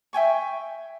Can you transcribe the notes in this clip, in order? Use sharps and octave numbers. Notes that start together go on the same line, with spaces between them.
E5 G5 G#5 C#6